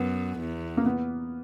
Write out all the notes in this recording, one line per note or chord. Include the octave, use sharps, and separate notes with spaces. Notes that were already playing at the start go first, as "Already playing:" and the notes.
Already playing: F#2 B3
E2
A#3
B3